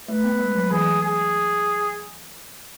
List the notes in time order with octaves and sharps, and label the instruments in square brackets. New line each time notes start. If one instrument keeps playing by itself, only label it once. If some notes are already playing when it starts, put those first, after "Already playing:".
[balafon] A3 [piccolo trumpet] B4
[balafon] B3
G#3
F#3
[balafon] E3 [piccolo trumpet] G#4
[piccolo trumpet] G#4